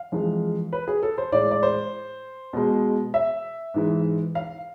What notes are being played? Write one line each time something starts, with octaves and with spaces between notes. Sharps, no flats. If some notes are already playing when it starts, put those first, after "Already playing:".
Already playing: F5
F2 E3 G#3
B4
G#4
A4
C5
A2 G#3 D5
D5
C5
B2 G#3
E5
G#2 E3 G#3
F5